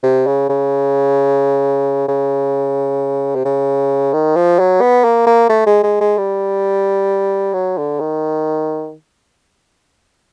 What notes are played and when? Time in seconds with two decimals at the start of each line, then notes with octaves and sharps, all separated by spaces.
0.03 C3
0.27 C#3
0.49 C#3
2.08 C#3
3.35 C3
3.45 C#3
4.13 D#3
4.36 F3
4.59 F#3
4.81 B3
5.04 A#3
5.26 A#3
5.49 A3
5.67 G#3
5.83 G#3
6.01 G#3
6.18 G3
7.53 F#3
7.77 D3
8.00 D#3